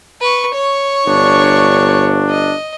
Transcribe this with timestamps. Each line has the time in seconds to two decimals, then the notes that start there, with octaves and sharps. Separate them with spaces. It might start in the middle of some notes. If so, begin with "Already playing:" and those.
0.21 B4 C#6
0.54 C#5 C#6
1.07 G1 D4
2.29 D#5